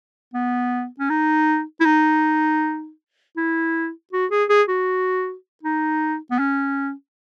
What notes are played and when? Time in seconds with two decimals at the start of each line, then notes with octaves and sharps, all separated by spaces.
0.34 B3
0.99 C#4
1.09 D#4
1.80 E4
1.85 D#4
3.37 E4
4.12 F#4
4.31 G#4
4.49 G#4
4.68 F#4
5.63 D#4
6.31 B3
6.39 C#4